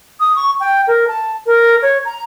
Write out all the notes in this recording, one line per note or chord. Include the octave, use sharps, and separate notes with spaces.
D#6
C#6
G5
A#4
A5
A#4
C#5
A#5